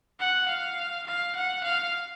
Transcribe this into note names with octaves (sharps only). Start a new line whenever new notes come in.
F#5
F5
F5
F#5
F5